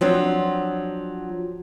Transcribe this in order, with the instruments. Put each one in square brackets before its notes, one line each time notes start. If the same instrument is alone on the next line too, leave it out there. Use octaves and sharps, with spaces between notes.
[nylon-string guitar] F3 F#3 C4 D4